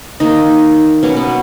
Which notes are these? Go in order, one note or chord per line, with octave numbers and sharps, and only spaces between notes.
D#3 A#3 D#4
B2 F#3 B3 C#4
B3